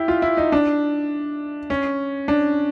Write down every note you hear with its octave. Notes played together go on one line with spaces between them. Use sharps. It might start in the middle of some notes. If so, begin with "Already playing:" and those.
Already playing: E4 G4
F4
E4
D#4
D4
C#4
D4